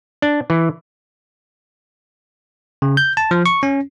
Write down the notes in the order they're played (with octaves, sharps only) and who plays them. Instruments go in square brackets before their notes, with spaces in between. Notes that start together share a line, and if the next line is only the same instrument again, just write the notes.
[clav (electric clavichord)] D4
E3
[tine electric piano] C#3
G6
A5
F3
C#6
C#4